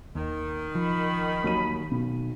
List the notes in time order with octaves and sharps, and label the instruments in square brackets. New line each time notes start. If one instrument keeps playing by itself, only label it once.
[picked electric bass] D#2 [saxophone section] D#3
[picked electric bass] F3 [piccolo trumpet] B5
[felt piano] D#2 F#3 D#7
B1